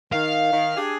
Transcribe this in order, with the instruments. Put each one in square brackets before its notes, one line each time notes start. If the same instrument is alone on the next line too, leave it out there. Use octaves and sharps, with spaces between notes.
[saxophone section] D#3 [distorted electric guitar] F5
[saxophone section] D#3
D4 G4 G#4